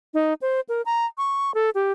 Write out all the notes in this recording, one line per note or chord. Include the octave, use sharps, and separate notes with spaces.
D#4
C5
A#4
A#5
C#6
A4
G4